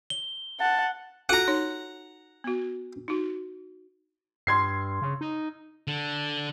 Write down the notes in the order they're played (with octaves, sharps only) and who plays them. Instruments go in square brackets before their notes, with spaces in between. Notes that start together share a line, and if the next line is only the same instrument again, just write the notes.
[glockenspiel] G7
[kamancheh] F#5 [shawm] A5
[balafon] F4 F#4 A4 [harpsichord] F#5 A#5
[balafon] D#4 C#5
B3 F#4
D#4 F#4
[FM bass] G2 [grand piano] C6 G#6 C7
[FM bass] C#3
D#4
[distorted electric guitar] D3